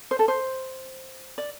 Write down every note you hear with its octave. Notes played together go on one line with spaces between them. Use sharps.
C5
A4
C5
D5